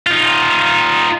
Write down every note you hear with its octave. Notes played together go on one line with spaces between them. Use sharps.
D#4 F4